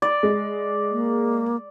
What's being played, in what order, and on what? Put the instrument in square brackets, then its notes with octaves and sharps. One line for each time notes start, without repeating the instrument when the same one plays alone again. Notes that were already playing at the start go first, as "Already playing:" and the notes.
[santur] D5
[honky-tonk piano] G#3
[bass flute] A#3